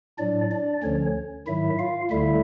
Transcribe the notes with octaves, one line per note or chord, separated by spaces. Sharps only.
A2 F#3 D4 D5
D4 D5
D2 D3 F3 C#4 C#5
G#2 D#3 F#3 E4 E5
F4 F5
D2 D3 G3 E4 E5